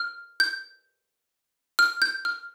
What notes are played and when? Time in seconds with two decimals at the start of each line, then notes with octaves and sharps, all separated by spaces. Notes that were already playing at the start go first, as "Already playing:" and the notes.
Already playing: F6
0.40 G6
1.79 F6
2.02 G6
2.25 F6